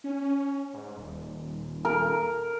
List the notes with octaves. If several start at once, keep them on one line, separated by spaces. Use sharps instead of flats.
C#4
G#2
D#1
A#4